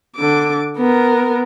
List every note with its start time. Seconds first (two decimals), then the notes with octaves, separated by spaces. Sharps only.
0.16 D3 D6
0.78 B3 A#4